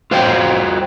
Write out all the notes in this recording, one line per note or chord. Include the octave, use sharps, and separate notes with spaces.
F4 F#4 C5 C#5 F5 G5